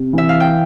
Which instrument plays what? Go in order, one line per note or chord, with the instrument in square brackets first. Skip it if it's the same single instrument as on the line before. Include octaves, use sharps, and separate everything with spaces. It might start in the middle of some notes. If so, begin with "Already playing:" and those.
Already playing: [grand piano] C3
[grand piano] E3 [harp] E5
[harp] F5
G5